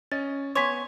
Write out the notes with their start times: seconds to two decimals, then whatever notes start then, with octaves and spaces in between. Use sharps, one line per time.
0.12 C#4 D#5 A6
0.55 B3 C#5 G#5 C6 D6 G#6 B6